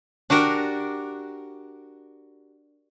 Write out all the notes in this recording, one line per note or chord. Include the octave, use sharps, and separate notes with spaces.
D4 F#4 G4 A#4